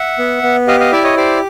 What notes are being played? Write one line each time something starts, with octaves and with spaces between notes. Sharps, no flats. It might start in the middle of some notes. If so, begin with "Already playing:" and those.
Already playing: E5 F#5
B3
B3
G4 D#5 F5
D#5 F5
E4 D5 E5
C#5 D#5
G4 C5 D5